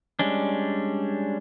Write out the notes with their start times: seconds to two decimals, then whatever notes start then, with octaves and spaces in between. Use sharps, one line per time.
0.19 G3 G#3 C#4 D4